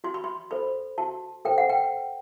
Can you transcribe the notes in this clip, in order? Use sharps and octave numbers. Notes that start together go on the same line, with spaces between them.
F#4 C6
B5
C6
A4 C5 B5
F#4 A5
A4 C5 G5
F#5
G5